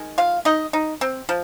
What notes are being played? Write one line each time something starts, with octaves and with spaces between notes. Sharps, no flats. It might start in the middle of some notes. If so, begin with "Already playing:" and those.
Already playing: D#3 G#3
F4 F5
D#4 D#5
D#4
C4
F3